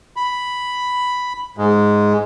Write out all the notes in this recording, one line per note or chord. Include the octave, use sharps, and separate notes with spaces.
B5
G#2 G#3